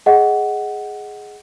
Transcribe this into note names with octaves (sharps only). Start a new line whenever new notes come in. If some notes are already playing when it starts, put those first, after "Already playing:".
G#4 D#5 F#5